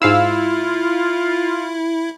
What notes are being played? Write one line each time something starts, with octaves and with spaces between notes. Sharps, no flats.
G#2 E4 F4 F5 E6